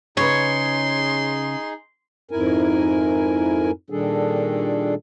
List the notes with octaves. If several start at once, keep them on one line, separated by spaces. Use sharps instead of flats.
C#3 D#4 G#4 B4 C#5 C6
F2 G#2 E4 A#4 G#5
A#2 D#3 G3 D4 G#4 A4